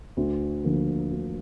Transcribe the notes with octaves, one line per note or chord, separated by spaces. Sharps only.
D2
D3 F3 A#3
D2